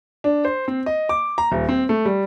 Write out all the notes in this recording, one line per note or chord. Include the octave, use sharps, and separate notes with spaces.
D4
C5
C4
D#5
D6
A#5
D#1
C4
A3
G3